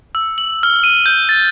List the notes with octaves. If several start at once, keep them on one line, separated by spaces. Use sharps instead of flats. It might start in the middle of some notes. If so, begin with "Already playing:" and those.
E6
F#7
F6
D#7
G6
A6